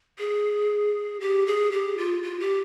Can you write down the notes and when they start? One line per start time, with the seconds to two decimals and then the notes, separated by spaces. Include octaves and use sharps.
0.19 G#4
1.20 G4
1.47 G#4
1.72 G4
1.98 F4
2.23 F4
2.40 G4